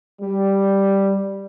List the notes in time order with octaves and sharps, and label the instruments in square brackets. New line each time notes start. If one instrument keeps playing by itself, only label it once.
[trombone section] G3